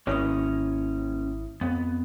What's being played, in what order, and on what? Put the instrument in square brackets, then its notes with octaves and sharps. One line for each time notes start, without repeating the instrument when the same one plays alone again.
[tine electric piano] G#1 E4 D#6 [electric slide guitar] A#3 C#4 C#5
[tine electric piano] F2 [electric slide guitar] B3